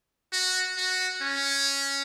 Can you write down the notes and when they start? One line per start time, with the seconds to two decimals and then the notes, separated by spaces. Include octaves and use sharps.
0.32 F#4
0.77 F#4
1.22 C#4